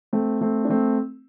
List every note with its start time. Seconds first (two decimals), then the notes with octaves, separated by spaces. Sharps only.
0.13 A3 C4
0.41 A3 C4
0.65 D4
0.70 A3 C4